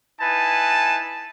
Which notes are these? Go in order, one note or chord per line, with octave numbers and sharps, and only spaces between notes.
D#4 E4 B4 G#5 A5